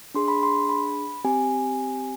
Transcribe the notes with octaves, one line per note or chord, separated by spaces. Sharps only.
D4 G#4 C6
B5
C6
B5
C4 G4 G#5